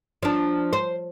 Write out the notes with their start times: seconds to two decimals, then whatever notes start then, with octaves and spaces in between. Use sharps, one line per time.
0.23 F3 D4
0.73 C5